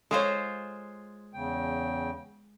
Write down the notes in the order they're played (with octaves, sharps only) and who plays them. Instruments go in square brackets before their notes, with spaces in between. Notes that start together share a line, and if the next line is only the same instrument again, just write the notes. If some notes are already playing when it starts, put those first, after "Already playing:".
[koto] G#3 F4 C5 [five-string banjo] A4 C#5
[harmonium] E2 C#3 G5